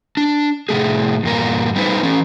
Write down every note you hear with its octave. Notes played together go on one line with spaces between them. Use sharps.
D4
A2 C3 A3 G#4
E2 G2 A#2 A#4
G3 B3 D#4 B4 C5
E3 C#4